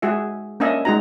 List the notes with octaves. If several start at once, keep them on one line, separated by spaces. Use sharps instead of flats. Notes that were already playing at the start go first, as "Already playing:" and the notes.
G#3 F#4 G#4 E5
A#3 C#4 D4 D#5 E5 G#5
G#3 D#4 F#4 A#5